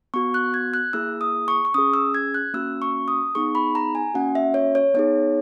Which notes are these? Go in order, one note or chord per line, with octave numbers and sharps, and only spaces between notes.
B3 F#4 C#6
F#6
G#6
F#6
A#3 E4 G#4 E6
D#6
C#6
C#6
C#4 G#4 D#6
E6
G#6
F#6
A#3 C#4 F#4 E6
C#6
D#6
B3 D#4 G#4 C#6
B5
A#5
G#5
A#3 C#4 F#4 F#5
E5
C#5
C#5
B3 D#4 G#4 C#5